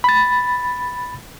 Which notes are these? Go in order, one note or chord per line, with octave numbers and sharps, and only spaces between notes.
B5 A6